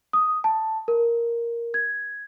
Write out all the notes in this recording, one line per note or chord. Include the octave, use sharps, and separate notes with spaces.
D#6
A5
A#4
G#6